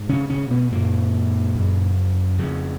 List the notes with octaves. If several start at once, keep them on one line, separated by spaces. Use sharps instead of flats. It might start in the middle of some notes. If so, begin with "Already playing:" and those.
Already playing: G#2
C#3 C#4
C#3 C#4
B2 B3
F#2 A#2 C#3 A#3
F#2 C#3
F2 C#3